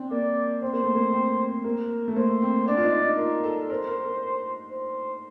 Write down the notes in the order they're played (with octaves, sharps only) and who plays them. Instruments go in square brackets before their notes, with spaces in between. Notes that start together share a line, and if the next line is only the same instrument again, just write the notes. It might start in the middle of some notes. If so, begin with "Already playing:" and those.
Already playing: [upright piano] C4 D4
[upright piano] A#3 [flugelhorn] D5
[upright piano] C4 [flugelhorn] C5
[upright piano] A#3
A3
A#3
C4
[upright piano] A#3 [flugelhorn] A#4
[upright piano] A3
[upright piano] A#3 [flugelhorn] C5
[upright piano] C4
[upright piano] D4 [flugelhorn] D5
[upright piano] F4
D#4
D#4
[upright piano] F4 [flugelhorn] A#4
[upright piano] A4
[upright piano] A#4 [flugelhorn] C5
[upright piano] A#4
A#4
[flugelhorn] C5